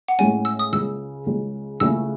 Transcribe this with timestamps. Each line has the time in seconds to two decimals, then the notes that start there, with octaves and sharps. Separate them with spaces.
0.08 F#5
0.19 A2 G#3 C#4 G#5
0.45 E6
0.59 D#6
0.72 C#2 C#3 G#3 E6
1.26 C#2 C#3 G#3
1.80 C#2 C#3 E3 A3 C#4 E6